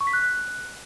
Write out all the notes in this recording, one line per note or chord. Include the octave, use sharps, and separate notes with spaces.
C#6
B6
F#6